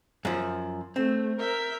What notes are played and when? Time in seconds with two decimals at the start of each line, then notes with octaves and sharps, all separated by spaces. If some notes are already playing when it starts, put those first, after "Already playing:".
0.25 F#2 F3
0.96 A3 C4
1.39 A#4 E5 G6